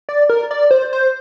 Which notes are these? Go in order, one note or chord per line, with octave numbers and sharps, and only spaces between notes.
D5
A#4
D5
C5
C5